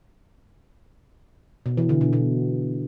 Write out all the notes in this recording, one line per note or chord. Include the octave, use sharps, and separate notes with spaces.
B2
E3
D3
B2
B2